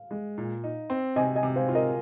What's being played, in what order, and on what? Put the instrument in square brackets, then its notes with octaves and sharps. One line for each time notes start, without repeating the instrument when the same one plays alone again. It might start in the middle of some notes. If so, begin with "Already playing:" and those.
Already playing: [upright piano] F5
[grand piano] G#3
A#2
D#4
C4
[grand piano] C3 [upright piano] D#5 G#5
[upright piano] D#5 G#5
[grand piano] C3
[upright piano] C5 F5
[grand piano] F4
[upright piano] A#4 D#5